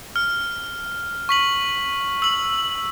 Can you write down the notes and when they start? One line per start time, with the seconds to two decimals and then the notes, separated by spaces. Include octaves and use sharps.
0.16 F6
1.29 C#6 B6 F#7
2.22 E6 F#7